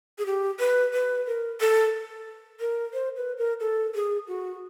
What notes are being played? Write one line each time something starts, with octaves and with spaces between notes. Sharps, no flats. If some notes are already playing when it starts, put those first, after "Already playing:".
G#4
G4
B4
B4
A#4
A4
A#4
C5
B4
A#4
A4
G#4
F#4